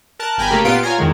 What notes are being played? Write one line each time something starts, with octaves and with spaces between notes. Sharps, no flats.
A#4 A5 F#6
G1 G5 G#5 A#5 B5
C#3 A3 A#3 G4
A#2 B3 F4 F5 C6 D7
F4 C#5 G#5 A#5
E2 D#3 G#3